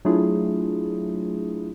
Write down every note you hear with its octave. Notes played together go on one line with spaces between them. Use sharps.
F#3 A3 D4 E4 F4 G#4